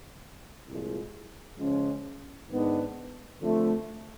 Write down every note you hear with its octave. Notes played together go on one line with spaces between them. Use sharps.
C2 A#2 F3 G#3
C#3 F3 G#3 C#4
G#2 D#3 G#3 B3 D4
F2 D3 F3 A3